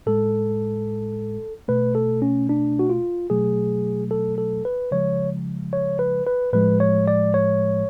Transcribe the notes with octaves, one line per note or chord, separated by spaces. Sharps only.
A2 G#3 A4
B2 A3 B4
A4
C#4
D4
F#4
F4
B2 F#3 A3 G#4
A4
A4
B4
C#3 F3 G#3 C#5
C#5
B4
B4
A2 F3 G#3 B4
C#5
D5
C#5